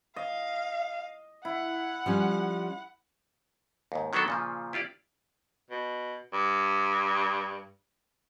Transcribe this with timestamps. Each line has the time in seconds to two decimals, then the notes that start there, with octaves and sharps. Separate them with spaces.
0.16 D#5 F5
1.45 E4 F#5
2.06 F3 G3 C#4
3.92 D#2 G#2
4.13 D#3 F#3 B3 D4 F#4 A4
4.28 A#2 C#3 F3
4.73 E4 F4 G4 D5
5.70 B2
6.33 G2